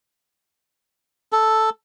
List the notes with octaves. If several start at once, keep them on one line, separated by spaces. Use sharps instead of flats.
A4